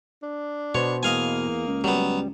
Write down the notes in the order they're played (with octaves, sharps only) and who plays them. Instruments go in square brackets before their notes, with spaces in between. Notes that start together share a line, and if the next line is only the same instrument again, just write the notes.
[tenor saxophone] D4
[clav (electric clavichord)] B2 B3 C5 [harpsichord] C#5
[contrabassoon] E2 [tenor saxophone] A#3 [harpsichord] D#5 F5 G#5
[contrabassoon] C#2
[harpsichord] F#3 B3 [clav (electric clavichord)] G3